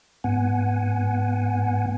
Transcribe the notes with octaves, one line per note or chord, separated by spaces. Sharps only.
G#2 B3 F#5 G#5